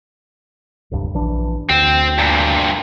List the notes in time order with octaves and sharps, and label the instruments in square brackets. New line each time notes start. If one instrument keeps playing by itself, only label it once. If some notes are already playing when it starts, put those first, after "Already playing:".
[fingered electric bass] D1 C2 G2
A#1 E3 D4
[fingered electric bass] D2 [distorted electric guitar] C4
[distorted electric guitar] G2 A#2